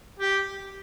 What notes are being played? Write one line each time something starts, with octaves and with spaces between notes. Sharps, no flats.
G4